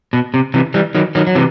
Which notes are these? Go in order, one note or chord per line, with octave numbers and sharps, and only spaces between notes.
B2
C3
C3 E3
E3 G3
D#3 F#3
D#3 F#3
F#3
C3 E3